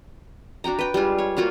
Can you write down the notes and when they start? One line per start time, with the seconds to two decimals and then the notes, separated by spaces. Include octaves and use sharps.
0.64 D4 F#4 G5 A#5
0.79 B4 G5
0.94 G3 G#3 F4
1.18 C#5
1.37 A#3 F4 F#4 F5